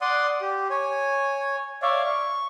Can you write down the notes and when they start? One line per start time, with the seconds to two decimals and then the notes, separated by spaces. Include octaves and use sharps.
0.01 D5 F#5 C6 D#6
0.41 G4
0.70 C#5 G#5
1.82 C#5 D5 E5 F5
2.04 C#6